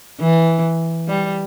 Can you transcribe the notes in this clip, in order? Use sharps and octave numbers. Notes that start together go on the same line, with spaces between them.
E3
G3